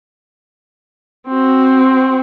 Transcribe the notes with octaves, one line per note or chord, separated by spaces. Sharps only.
C4 F#4